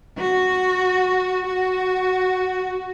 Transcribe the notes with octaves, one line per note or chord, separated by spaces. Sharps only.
F#4
F#4